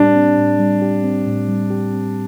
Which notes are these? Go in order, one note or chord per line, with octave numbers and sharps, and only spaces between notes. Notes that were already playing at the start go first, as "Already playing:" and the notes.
Already playing: A2 G3 C4 D4 G4
C4
A2
G3
G4
C4
A2
G3
G4
C4